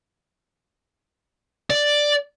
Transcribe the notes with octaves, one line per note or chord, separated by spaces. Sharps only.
D5